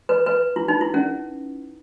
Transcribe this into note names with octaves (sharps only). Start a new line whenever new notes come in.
B4
B4
E4
D#4
E4
C#4